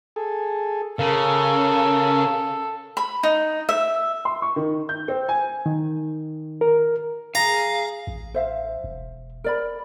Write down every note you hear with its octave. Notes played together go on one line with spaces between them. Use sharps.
G#4 A4
C#3 A4 A#4 F5
B5
D#4
E5
C6
C#6
D#3
G6
C4
G#5
D#3
A#4
G#4 F5 A#5
A1
C5 E5 F5
E1
A#4 D5 B5